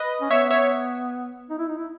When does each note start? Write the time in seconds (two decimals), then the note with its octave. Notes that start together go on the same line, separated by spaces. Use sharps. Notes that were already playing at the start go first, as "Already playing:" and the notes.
Already playing: B4 D#5
0.21 C#4
0.30 B3 C#5 E5
0.51 C#5 E5
1.50 D#4
1.59 E4
1.68 D#4
1.78 E4